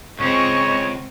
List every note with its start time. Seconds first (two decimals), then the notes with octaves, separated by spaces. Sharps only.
0.20 C#2 C#3 C4 C#5 D#5 C#6